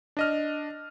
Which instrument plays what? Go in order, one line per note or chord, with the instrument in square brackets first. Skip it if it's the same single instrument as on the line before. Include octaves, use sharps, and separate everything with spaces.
[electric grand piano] D4 D#5 F6